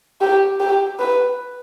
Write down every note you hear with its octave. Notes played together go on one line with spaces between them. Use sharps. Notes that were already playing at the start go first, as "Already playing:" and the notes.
G4
G4
B4